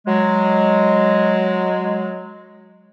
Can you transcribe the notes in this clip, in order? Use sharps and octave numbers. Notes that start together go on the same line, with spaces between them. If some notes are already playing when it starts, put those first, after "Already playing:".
F#3 G#3